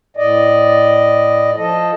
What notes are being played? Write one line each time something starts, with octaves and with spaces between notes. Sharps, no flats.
A2 D5 D#5
F3 A4 D#5